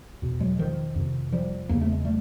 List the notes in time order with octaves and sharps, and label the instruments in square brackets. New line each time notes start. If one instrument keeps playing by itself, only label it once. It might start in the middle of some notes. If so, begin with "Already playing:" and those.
[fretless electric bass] E2 B2
F#3 G#3
D#3 F3
F2 C3
F3 G3
E2 C#3 A#3
A3
G#3
G3 A3